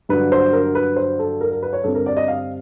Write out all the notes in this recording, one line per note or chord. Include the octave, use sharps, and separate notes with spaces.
G2 D3 F#3 B4
C5
A#4
B4
C5
A4
A#4
A#4
B4
C#5
G2 D3 G3 C4 A4
A#4
D5
D#5
F5